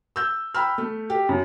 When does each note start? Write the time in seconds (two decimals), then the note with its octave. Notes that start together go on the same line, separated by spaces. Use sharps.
0.16 E6 G6
0.54 G5 B5 E6 F6
0.78 A3
1.10 G4
1.29 F#2